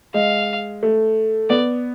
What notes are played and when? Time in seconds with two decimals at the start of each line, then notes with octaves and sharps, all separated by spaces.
0.14 G#3 F5
0.83 A3
1.50 B3 D5